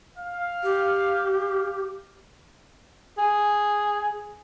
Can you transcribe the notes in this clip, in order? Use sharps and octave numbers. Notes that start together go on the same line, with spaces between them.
F5
G4
G#4